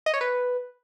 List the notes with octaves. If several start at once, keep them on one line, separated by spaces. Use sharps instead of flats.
D#5
C#5
B4